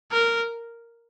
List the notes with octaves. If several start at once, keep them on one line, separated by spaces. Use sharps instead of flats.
A#4